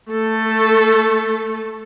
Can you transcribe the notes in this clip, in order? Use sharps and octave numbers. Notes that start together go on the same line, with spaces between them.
A3 A4